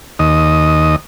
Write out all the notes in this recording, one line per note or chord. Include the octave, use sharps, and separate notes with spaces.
D#2 D#5